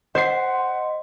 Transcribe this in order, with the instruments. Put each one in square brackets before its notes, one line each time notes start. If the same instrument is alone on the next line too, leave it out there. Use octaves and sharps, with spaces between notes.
[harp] C5 C7 [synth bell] D#5 C6 [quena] F#5